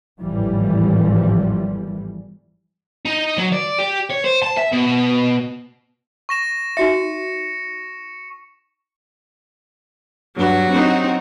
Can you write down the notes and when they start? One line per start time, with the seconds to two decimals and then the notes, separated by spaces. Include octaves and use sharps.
0.20 G#1 E2 A2 E3 F3 G3
3.05 D#4
3.38 F#3
3.52 D5
3.79 G4
4.10 C#5
4.24 C5
4.42 A5
4.58 E5
4.72 B2
6.29 C#6 A#6 E7
6.77 D#4 F#4 E5 C#7
10.36 G2 F#3 F#4
10.70 C4 D#4